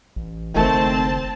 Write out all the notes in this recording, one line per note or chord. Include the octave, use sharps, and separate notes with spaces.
A1
F#1 D#3 A3 C4 A5